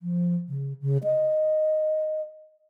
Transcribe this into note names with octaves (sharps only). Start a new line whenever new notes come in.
F3
C#3
C#3
D#5